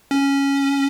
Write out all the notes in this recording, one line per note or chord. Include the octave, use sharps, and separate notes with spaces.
C#4